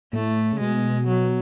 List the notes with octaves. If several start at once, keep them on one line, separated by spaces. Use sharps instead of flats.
A2 A3
C#3
B2 G#3
F#3